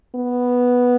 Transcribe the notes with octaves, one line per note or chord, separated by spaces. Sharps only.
B3